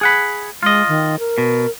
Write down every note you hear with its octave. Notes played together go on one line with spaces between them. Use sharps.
G#4 F#5 B5
G#3 F4 D#5
D#3
A#4
B2